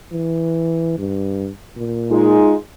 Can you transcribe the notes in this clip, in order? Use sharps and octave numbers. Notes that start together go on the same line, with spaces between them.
E3
G2
A#2
G#3 D#4 F4